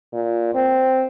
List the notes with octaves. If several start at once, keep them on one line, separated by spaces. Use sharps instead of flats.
A#2
C4